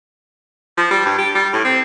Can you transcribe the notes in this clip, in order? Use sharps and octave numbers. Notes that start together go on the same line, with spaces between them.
F3
G3
G2
G4
G3
A2
C4